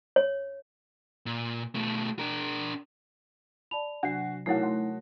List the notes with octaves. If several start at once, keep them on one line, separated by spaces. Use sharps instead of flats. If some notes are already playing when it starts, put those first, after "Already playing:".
C#5
A#2
B2 A3
D4 A#4
D5 A5 B5 F7
C3 F#3 D4 F#4 C7
B1 A3 D#4 E4 F#4 A#4 C#5 F#5
F#4 C6